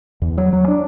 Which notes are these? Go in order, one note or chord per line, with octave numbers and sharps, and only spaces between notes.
E2
F#3
F#3
D4